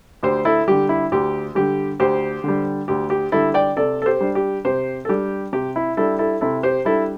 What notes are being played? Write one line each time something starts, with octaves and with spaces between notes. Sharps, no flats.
D2 G4 C5
E4 A4
D3 G3 G4
E4
D2 G4
D3 G3 G4
D2 G4 C5
D3 G3
D2 G4
G4
D3 G3 E4 A4
D5 G5
C3 A4 D5
A4
G4 C5
G3 D4
G4
C3 G4 C5
A4
G3 D4 G4
C3 G4
E4
G3 D4 E4 A4
E4 A4
C3 E4 A4
G4 C5
G3 D4 E4 A4